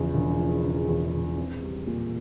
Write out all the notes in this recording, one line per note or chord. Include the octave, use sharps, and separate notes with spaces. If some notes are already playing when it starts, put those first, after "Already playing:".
Already playing: E2 C#3 F3
E1
F3
C#3
E2
E1
C4
G3
A#2